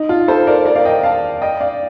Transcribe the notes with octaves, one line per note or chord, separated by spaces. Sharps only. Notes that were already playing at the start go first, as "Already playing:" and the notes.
Already playing: D#4
F4
A4 C5
A#4 D5
A#4 D5
D5 F5
D#5 G5
F5 A5
D#5 G5
D5 F5